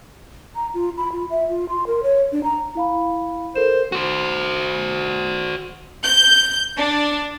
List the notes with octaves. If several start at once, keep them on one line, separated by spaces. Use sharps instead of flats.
A#5
F4
B5
F4
E5
F4
C6
A#4
C#5
D4
A#5
E4 F5 B5
A4 A#4 C5 E7
F#4 C5
G6
D4